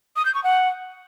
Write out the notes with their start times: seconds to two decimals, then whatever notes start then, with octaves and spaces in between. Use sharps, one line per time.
0.16 D#6
0.25 G6
0.35 C#6
0.44 F#5